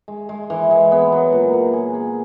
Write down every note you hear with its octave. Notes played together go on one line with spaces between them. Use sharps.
G#3
G#3
E3
G#3
B3
F#3
A#2
A#2
G#4
G#4